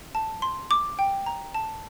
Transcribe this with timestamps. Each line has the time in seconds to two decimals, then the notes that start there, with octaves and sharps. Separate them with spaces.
0.15 A5
0.42 C6
0.71 D6
0.99 G5
1.26 A#5
1.54 A5